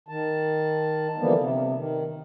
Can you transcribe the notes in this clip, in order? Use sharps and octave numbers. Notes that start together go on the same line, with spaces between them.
D#3 A5
D3 E3 F3 G3 A#3 B3
C3
D#3